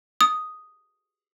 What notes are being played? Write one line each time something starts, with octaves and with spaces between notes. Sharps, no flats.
D#6